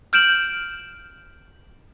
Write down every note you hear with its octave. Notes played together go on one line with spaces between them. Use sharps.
F6 G6 D7 E7 F#7